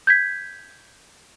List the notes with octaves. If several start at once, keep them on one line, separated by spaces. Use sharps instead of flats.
G6 G#6 B6